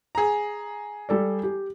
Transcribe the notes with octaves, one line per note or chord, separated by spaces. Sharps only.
G#4 A#5
G3 A4 D5
G4